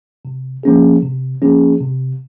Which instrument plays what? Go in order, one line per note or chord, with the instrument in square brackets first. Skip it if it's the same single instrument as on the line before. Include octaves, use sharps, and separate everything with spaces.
[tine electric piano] C3
F3 A#3 C#4 G#4
C3
F3 A#3 C#4 G#4
C3